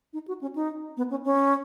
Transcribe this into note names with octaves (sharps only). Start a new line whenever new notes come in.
D#4
F#4
C#4
D#4
B3
C#4
C#4